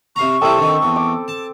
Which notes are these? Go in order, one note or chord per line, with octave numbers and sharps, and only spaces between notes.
C3 F5 A#5 C#6
C3 G3 C4 E4 A4 D#6
D3 D#3
E2
D6
A5